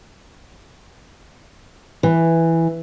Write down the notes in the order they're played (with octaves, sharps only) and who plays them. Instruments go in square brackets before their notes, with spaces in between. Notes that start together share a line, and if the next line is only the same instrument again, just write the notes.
[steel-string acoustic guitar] E3